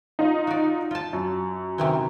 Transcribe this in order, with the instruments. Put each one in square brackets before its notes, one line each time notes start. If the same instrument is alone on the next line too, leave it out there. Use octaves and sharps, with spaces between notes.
[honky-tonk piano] D#4 F4
[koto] F#4 D5
F4 A5
[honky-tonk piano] F#2
[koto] C3 D#3 E3